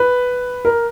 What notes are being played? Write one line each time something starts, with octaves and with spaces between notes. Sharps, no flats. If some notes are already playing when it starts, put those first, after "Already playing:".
Already playing: B4
A#4